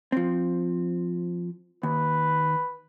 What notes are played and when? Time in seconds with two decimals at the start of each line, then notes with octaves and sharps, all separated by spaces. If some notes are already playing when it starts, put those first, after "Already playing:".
0.12 F3 C4
1.83 D#2 B4